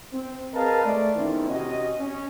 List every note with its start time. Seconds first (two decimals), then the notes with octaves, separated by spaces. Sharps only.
0.13 C4
0.54 G#4 A#4 B4 D#5 F5 A5
0.84 G#3 A3 D5
1.16 E2 D#3 C4 C#4 D#4 E4
1.49 C3 C#4 F#4 D#5
1.98 C#4